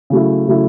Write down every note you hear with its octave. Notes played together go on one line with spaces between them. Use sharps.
C#3 F#3 A3 E4
C#3 F#3 A3 E4